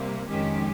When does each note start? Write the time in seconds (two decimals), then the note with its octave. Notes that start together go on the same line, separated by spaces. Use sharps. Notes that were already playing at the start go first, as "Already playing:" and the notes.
Already playing: C3 G3 A#3
0.28 F2 D#3 G#3 C#4 G4